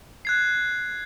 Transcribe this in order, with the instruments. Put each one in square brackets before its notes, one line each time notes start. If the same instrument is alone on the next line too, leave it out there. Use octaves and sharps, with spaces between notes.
[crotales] F#6 G#6 C7